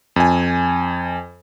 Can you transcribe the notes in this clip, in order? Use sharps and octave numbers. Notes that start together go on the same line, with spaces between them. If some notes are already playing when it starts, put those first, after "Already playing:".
F2 G#5